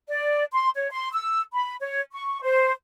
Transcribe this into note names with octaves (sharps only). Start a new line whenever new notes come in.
D5
C6
C#5
C6
E6
B5
C#5
C#6
C5